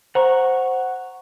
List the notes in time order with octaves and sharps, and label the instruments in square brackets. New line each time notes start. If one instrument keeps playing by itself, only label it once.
[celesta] C5 [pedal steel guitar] F#5 A#5 C#6